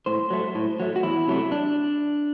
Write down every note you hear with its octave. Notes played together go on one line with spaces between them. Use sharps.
A2 C5
F#3 A3
A2
F#3 A3
F#4
E2 E4
C3 F#3 A3
D4